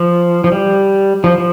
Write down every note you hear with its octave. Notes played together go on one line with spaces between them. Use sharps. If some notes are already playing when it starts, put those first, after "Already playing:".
Already playing: F3
F3
G3
F3
F3